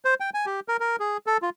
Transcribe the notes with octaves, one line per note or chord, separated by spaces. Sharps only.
C5
G5
G#5
G4
A#4
A#4
G#4
A4
F4